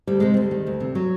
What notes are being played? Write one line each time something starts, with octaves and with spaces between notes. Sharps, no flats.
D2 G3
C3 G#3
D2 G3
D#3
D2
C3
F#3